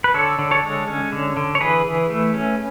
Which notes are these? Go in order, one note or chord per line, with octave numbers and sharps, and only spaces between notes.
B4
D3 A4 C#5
D3
A4 C#5
G#3
C#4
D3
D3
C#5
E3 G#4 B4
E3
A3
C#4